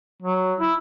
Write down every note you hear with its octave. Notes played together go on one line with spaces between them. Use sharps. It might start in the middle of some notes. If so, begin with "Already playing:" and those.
F#3
E4